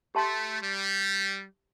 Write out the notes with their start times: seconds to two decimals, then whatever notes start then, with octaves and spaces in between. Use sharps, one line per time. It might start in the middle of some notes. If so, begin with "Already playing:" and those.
0.15 A3 G4 E5 A5 C6
0.61 G3